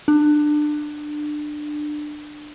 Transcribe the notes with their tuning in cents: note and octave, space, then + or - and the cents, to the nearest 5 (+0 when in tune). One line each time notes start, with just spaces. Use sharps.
D4 +25